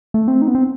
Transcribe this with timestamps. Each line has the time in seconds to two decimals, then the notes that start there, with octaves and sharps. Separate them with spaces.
0.14 A3
0.28 C4
0.42 D#4
0.48 B3
0.55 C4